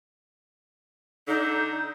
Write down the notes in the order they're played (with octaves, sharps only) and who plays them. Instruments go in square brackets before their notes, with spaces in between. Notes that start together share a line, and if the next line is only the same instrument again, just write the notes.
[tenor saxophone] D3 [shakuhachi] D#4